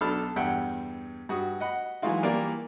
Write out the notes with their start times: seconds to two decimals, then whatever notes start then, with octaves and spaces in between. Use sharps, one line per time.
0.01 B1 D4 A4 B5 F6
0.36 E2 G2 E5 F#5 G5
1.29 G2 F#4 D#6
1.60 D#5 F#5 B5
2.02 E3 F#3 G#3 D#4 F4 F#4
2.23 E3 G3 A#3 E4 D5